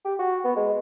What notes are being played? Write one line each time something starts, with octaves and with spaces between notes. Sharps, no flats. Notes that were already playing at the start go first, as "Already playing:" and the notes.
G4
F#4
B3
G#3